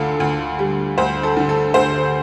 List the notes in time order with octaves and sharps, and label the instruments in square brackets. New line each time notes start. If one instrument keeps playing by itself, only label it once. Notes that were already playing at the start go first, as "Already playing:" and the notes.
Already playing: [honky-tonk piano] D2 D3 F4 A4
D2
G3
D2 C5
A4
D3
A4
D2 C5